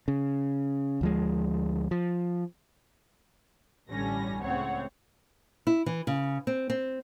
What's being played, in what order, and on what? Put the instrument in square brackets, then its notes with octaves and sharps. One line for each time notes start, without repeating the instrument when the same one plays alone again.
[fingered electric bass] C#3
D2 F3 G#3
F3
[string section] A1 G2 D3 G3 C#4 A#6
C#2 A2 C#3 C4 C#5 F#5
[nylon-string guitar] E4
E3
C#3
C4
C4